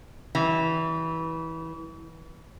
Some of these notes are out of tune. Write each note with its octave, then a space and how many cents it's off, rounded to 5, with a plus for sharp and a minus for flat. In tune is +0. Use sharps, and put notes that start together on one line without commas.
E3 -20 G3 -45